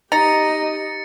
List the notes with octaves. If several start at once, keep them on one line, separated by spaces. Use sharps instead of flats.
D#4 G4 D#5 A#5 A6 C#7